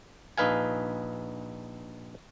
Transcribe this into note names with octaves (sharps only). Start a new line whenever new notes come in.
A#1 D#4 B4 F5 G#5